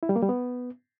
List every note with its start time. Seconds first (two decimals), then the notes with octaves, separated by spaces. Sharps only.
0.03 E4
0.09 G3
0.16 A#3
0.22 G3
0.29 B3